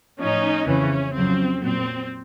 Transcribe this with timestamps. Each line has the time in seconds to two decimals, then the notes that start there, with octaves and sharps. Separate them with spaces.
0.19 A2 F3 C#4 D#4
0.66 F2 C#3 E3 C#4
1.14 F2 C#3 F#3 C4
1.61 A#2 F#3 C4